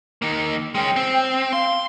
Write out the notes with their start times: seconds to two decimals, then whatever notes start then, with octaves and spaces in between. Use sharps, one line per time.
0.22 D#3 A#3
0.75 G#3 C#4 G5
0.96 C4
1.53 F5 C6